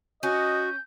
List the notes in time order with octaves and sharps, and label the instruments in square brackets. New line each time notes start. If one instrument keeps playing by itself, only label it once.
[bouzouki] C#4 [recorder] F#4 [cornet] D#5 [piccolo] G6